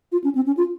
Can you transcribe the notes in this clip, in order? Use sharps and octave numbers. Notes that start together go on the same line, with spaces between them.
F4
C#4
C4
C#4
F4